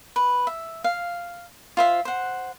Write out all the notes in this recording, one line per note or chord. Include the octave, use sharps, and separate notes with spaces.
B4
E5
F5
F4 C5 E5
C5 F#5